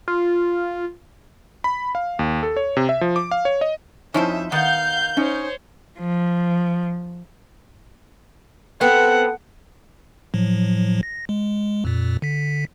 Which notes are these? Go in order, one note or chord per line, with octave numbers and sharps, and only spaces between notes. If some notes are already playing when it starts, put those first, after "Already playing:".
F4
B5
F5
D#2
A4
C#5
C3
E5
F3
D6
F5
C#5
D#5
F2 F3 C#4 D#4 E4 C5 E5
D#3 B3 F5 F#5 G6
C#4 D#4 C5 C#5
F3
B3 C4 A4 F#5
A2 F3 F#3
A#6
G#3
F2 A#2
D3 B6